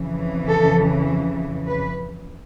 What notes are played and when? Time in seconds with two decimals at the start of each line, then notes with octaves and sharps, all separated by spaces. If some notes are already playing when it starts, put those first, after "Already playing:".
Already playing: F2 C#3 E3
0.48 A4
1.66 B4